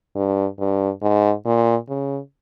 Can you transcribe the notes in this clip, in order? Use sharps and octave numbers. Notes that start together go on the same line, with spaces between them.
G2
G2
G#2
A#2
C#3